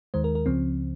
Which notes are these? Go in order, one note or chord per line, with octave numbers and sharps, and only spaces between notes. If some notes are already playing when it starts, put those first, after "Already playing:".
D#2 D#3 G#3 C5
A#4
A#4
C#2 C#3 F3 C4